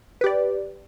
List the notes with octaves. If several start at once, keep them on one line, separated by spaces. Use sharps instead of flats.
G4 B4 D5